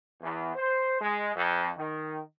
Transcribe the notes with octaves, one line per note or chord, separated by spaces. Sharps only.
E2
C5
G#3
F2
D#3